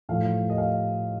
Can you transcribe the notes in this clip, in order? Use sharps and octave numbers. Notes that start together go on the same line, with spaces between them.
A2 F3 A3 F5
D#5
F5